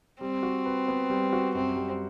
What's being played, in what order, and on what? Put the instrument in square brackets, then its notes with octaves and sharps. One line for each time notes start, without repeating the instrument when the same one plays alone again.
[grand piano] G3 [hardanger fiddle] C4
[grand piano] F#4
B4
B3
G3
F#4
[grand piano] F#2 [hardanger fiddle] C4
[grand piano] G3